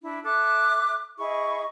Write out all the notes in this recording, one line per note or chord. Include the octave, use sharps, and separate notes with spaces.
D4 E4
A4 E5 D6 F#6
E4 G#4 D#5 C#6